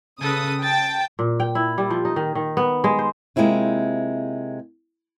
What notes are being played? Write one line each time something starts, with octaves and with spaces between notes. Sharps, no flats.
C#3 A4 B4 D#6
G5 A5 A6
A#2
G5
E4
G3
F3
D#4
D#3
D#3
B3
G#3
C5
C3 G#3 A#3 C4 E4 F4